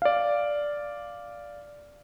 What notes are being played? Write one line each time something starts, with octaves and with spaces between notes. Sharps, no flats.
D5 F5